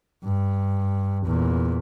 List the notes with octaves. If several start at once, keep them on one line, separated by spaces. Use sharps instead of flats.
G2
E2 A#2